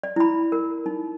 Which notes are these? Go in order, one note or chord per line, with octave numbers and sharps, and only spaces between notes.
D5
E4 B5
A#4
D#4